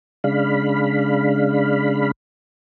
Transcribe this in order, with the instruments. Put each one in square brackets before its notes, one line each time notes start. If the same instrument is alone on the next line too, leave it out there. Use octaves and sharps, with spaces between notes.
[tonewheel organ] C#3 G#3 D4 F5 B5